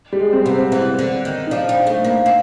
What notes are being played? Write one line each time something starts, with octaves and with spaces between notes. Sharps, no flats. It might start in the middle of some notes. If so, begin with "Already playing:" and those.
G3
G#3
C4
C3 B3
C4
E3
D3
D#3
D#4
F3 D4
G3
A3
A#3
C4